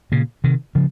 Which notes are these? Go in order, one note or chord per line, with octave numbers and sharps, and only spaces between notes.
A#2 C#3
C3 D#3
C#3 F3